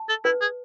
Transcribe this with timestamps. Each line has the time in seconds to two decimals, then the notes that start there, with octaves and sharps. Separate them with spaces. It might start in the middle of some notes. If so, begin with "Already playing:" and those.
Already playing: A5
0.09 A4
0.25 E4 B4
0.41 G#4